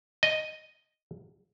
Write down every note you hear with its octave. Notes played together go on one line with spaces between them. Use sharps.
D#5